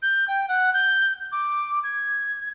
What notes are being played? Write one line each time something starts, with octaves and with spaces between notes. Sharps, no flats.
G6
G5
F#5
G6
D6
G#6